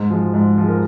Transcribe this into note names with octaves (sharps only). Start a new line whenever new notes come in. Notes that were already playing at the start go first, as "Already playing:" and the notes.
Already playing: G#2
F3 G#3
G#2
F3 G#3
A#4